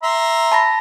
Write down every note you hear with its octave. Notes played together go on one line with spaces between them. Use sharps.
E5 A#5 C6
A5 B5 A#6